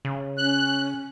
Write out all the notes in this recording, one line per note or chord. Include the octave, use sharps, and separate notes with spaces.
C#3
C#4 F#6